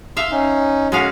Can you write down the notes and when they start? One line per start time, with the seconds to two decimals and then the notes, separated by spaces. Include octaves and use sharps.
0.17 E5 F5 C6
0.31 C#4 D#4
0.92 G#3 C#4 F#4 F5